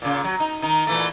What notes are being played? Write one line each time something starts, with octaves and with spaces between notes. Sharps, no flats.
A#2 C#3
F#3
D#4
D#3 D#4
A#2 E3 A3